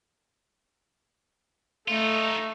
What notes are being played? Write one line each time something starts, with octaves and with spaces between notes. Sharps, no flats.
A3 D#4 F4